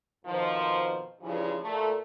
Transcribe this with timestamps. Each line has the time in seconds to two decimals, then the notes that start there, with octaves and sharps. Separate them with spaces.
0.24 F2 B2 D#3 F3 C5
1.21 G2 C#3 E3 F3
1.62 A#2 A3